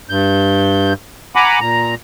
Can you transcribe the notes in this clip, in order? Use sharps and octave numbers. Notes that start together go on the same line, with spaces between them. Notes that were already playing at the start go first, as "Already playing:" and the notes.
G2 G6
F#5 G#5 A#5 B5 D6
A#2 A#5